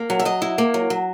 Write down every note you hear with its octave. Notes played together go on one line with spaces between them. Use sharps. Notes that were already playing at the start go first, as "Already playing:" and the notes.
Already playing: A#3
F#3
E5
F#3 D#5
E4
A#3
F#3
F#3